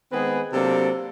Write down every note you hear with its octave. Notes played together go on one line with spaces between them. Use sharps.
D#3 G#3 B3 C4 G#4 B4
C3 F#3 A#3 C4 D4 A4